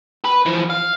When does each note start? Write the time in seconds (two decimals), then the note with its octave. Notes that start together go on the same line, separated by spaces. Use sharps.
0.25 B4
0.46 E3 F3
0.70 F5